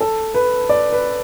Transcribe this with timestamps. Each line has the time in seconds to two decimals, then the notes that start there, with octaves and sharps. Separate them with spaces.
0.01 A4
0.34 B4
0.69 D5
0.93 B4